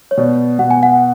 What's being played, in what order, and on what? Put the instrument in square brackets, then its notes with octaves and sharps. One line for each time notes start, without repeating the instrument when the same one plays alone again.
[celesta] C#5
[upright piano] B2 [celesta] D5
[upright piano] B2 [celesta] F#5
[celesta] G#5
F#5